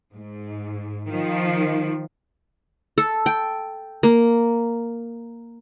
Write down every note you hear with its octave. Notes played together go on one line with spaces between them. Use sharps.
G#2
D#3 F3
A4
G5
A#3